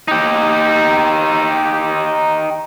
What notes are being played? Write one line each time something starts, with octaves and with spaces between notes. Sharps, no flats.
D#4 G4